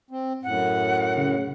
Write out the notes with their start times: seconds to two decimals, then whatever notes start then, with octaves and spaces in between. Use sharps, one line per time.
0.11 C4
0.43 F#2 A2 F#5
1.17 C#3